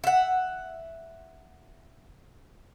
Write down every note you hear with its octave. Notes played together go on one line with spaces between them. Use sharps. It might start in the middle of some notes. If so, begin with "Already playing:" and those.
E5 F#5